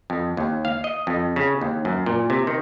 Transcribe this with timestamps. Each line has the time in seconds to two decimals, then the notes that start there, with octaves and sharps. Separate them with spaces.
0.10 F2
0.37 D#2
0.65 F5
0.84 D#5
1.07 F2
1.36 C#3
1.61 D#2
1.85 F#2
2.06 A#2
2.30 C3
2.47 D#3